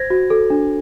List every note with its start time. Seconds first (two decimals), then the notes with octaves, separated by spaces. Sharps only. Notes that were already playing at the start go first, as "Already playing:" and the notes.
Already playing: C5 G#6 A#6
0.10 F#4
0.30 A4
0.50 D4